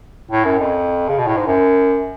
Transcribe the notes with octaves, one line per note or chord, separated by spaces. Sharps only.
A2
F#2
F2
C#3
B2
A2
G#2
F#2